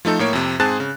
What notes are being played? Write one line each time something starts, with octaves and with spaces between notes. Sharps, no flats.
F3 A3 D#4 A4
A2 A#3 C#5 D7
F2 C3
G#2 C4 G#4 A5 F#6 A6
C#3